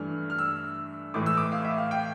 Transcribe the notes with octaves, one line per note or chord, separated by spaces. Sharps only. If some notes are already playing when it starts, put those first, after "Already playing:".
Already playing: G2 E3 A3 D4 F6
F6
E6
A2 E3 A3 D6
E6
D6
F5
E5
F5
G5